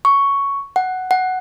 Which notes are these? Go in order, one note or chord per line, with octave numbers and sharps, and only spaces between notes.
C#6
F#5
F#5